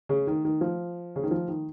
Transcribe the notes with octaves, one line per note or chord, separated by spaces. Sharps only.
C#3
D#3
D#3
F3
C#3
D#3
F3
D#3